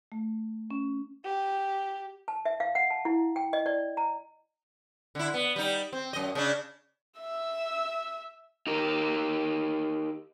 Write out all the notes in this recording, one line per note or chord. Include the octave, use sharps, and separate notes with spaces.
A3
C#4
G4
A5
E5
F5
F#5
A5
E4
G5
D#5
D5
A#5
D3 E4
B3
G3 D#4
C4
F#2 D#5
C#3 D4
E5 E6
D#4 G4 A#4